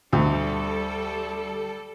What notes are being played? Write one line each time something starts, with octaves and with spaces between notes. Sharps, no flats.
D2 G3 A4